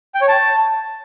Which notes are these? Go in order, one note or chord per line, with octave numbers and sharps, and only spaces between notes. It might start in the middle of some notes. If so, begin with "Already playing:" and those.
G5
C#5
A5